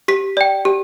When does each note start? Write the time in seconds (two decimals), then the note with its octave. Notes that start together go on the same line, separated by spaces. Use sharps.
0.08 G4 B6
0.37 D5 G5
0.65 G4